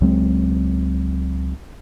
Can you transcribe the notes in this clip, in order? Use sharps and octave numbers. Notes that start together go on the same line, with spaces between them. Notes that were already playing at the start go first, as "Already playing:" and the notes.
C#2 F#3 G#3 C4